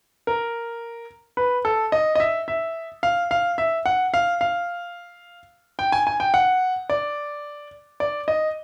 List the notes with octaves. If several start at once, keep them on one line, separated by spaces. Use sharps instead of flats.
A#4
B4
A4
D#5
D#5
E5
E5
F5
F5
E5
F#5
F5
F5
G5
G#5
G#5
G5
F#5
D5
D5
D#5